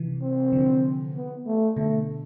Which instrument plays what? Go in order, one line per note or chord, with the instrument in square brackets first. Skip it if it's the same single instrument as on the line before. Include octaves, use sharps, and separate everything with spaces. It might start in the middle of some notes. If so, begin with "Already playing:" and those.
Already playing: [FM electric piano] C3 E3
[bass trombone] C4
[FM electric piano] D3 F3
[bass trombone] B3
A3
[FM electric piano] B2 D3 [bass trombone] A3